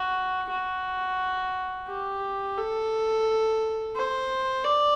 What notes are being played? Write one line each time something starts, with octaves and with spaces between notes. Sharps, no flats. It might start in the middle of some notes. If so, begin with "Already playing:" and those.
Already playing: F#4
F#4
G4
A4
C5
D5